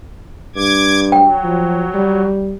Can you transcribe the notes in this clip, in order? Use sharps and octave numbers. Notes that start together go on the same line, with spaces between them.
G2 D6 G#6
F#3 G5
F3
G3